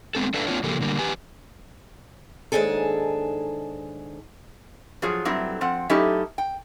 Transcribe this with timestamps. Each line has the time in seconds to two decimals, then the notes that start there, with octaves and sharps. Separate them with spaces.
0.15 G#3 B3 C4 A4
0.34 D4 A4 B4 E5 F5
0.47 A#3 C4 D4 F4 C#5 F#5
0.63 C#3 F3 A#3 G4 A4 A#4
0.81 D3 G3 A#3
0.99 E2 G4 B4 G#5
2.52 D#2 G#2 B2 D4 G#4 A4
5.02 F3 F#3 F4 G#4
5.25 G2 F#3 A3 C4 E4
5.61 F3 C4 F#5
5.90 F#3 A3 C#4 D#4 E4 G4
6.38 G5